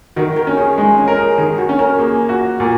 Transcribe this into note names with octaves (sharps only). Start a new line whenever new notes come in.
D#3 F#4
A#4
C#4
G#4
G#3 D#4
C#4
A#4
G#4
D#3 G#4
F#4
C#4
A#4
A#3 G#4
F#4
A#2